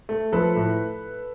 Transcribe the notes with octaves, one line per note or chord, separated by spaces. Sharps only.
A3
F3 A4 B4
A2